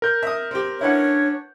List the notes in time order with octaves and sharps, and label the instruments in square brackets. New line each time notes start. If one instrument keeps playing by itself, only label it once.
[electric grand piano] A#4 G6
[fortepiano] E5 D#6
C4 G4
[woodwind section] C#4 D4 C#5 [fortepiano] E4 B4 F#5